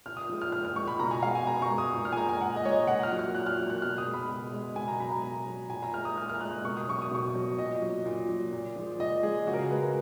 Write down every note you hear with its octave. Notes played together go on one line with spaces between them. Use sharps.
A#2 F6
D#6
F3 G#3
F6
A#2 F6
F6
F3 G#3 C#6
B5
B2 A#5
G#5
G#3 F5
G#5
B2 A#5
C#6
G#3
D#6
A#2
F6
G#5
G#3 A#5
G#5
A#2 F#5
D#5
G#3 C#5
D#5
A#2 F#5
F6
F#3
F6
A#2 F#6
F6
F#3
F#6
B2 F6
D#6
G#3
B5
B2
G#3
B2 G#5
A#5
F#3 B5
A#5
B2
F#3
A#2 G#5
A#5
G#3 F6
D#6
A#2 F6
F6
G#3 F#6
B2 C#6
D#6
F#3 C#6
D#6
B2 C#6
F#3
A#2 D#5
F#3
A#2
F#3
A#2
F3 G#3
A#2 D#5
F3 G#3 G#4
C#3 F#4
A#4
G#4
G#3 B4
A#4